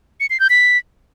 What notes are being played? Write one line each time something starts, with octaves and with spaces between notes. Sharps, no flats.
C#7
C7
G6
B6